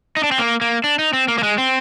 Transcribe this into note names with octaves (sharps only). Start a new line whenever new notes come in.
D#4
D4
C4
A#3
A#3
D4
D#4
C4
A#3
A#3
G#3
C4